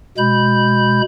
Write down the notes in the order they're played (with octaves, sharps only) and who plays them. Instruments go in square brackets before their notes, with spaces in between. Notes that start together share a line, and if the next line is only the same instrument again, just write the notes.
[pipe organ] B2 G#3 B5 G6